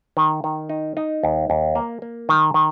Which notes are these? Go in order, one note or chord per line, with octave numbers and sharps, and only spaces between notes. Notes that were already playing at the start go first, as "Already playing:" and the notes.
D#3
D#3
D#4
D#4
D#2
D#2
A#3
A#3
D#3
D#3